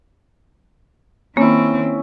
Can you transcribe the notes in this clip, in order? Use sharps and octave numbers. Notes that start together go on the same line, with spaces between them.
D#3 A#3 C4 C#4 E4